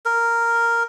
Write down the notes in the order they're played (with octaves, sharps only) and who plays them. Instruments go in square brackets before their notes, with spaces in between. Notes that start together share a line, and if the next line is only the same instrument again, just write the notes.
[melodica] A#4